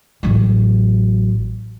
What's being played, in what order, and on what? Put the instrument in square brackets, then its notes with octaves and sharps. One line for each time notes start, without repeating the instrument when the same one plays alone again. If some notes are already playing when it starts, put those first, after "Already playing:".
[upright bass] A1 F#3